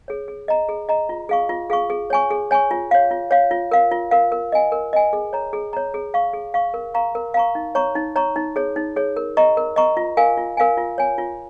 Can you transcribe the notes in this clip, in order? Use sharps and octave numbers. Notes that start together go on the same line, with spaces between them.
G#4 C#5
G#4
D#5 A#5
G#4
D#5 A#5
F4
G#4 F5 C#6
F4
G#4 F5 C#6
G#4
C#5 G#5 C#6
G#4
C#5 G#5 C#6
F4
C#5 F5
F4
C#5 F5
F4
A#4 F5
F4
A#4 F5
A#4
D#5 G#5
A#4
D#5 G#5
G#4
C#5 A#5
G#4
C#5 A#5
G#4
F5 C#6
G#4
F5 C#6
A#4
F5 A#5 C#6
A#4
F5 A#5 C#6
D#4
C#5 A#5 C#6
D#4
C#5 A#5 C#6
D#4
G#4 C#5
D#4
G#4 C#5
A#4
D#5 A#5 C#6
A#4
D#5 A#5 C#6
F4
A#4 F5 G#5
F4
A#4 F5 G#5
F4
C#5 G#5
F4